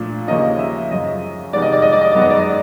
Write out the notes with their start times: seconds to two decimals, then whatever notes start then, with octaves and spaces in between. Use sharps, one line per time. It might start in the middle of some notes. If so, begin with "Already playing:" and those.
Already playing: A#2 F3 A3 D4
0.28 D#2 C#3 F3 A#3 C#4 D#5
0.59 E5
0.90 F#2 C#3 F3 D#5
1.52 F2 C3 D#3 G#3 B3 D5
1.62 D#5
1.73 D5
1.82 D#5
1.92 D5
2.01 D#5
2.12 F#2 D#3 G#3 B3 D5
2.22 D#5
2.30 D5
2.40 D#5